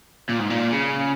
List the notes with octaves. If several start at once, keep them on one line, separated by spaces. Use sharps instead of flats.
A#2
G#2
A#2
C#3